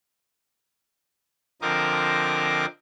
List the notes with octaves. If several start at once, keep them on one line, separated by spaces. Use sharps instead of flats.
D3 F3 C4 A#4 D#5 D6